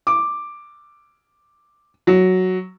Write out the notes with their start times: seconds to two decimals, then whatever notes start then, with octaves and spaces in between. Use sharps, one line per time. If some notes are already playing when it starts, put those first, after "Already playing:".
0.07 D6
2.07 F#3